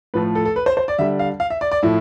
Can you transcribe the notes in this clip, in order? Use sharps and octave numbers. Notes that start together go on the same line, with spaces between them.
A2 F3 A3 B4
A4
A4
B4
C5
C5
D5
D3 G3 E5
F5
F5
E5
D5
D5
A2 F3 E4